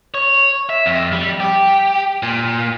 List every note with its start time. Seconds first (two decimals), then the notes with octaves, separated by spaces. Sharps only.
0.14 C#5
0.69 E5
0.86 F2
1.13 G3
1.40 G4
2.23 A#2